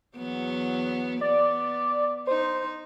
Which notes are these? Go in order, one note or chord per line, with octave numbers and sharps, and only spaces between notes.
E2 F#3 B3
B3 D5
D#4 C5